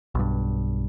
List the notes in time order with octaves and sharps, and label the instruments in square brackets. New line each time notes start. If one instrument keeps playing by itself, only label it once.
[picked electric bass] B1 G2